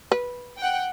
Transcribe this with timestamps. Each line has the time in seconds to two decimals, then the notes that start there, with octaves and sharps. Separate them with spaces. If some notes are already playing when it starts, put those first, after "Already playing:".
0.12 B4
0.57 F#5 G5